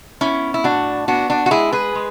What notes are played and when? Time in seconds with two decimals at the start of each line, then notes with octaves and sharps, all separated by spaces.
0.21 B3 C#4 E4
0.54 E4
0.64 A2 D4 F#4
1.08 B3 D4 F#4
1.30 D4 F#4
1.46 F#4
1.51 G#3 E4 G#4
1.72 G#4 B4
1.95 G#3